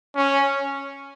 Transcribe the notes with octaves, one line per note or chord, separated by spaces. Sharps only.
C#4